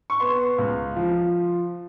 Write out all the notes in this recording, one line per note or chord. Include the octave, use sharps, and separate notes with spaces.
C#6
B3 C6
C#2
F3